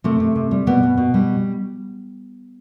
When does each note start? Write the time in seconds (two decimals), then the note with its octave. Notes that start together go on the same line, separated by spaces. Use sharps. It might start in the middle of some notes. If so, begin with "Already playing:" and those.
0.04 C3 A3
0.20 C3
0.35 C3
0.51 G3
0.67 B2 B3
0.83 B2
0.97 B2
1.14 G3